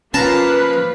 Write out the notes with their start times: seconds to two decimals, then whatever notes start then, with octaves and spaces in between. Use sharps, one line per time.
0.14 F3 A#3 C#4 B4 F5 A5 A#5